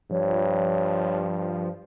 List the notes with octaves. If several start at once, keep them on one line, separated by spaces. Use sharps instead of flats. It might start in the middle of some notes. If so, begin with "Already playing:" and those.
G2 F3 C#5